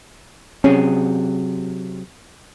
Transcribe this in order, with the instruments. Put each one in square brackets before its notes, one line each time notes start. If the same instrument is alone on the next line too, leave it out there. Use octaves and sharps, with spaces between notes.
[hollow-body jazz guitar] C3 F#3 G#4 [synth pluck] C#4